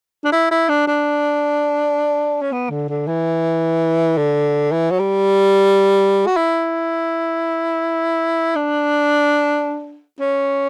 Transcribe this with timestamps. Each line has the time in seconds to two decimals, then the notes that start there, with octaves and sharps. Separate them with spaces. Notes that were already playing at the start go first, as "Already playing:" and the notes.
0.25 D4
0.32 E4
0.51 E4
0.69 D4
0.87 D4
2.41 C#4
2.52 B3
2.70 D3
2.89 D3
3.07 E3
4.17 D3
4.71 E3
4.91 F#3
4.99 G3
6.27 F#4
6.36 E4
8.55 D4
10.20 C#4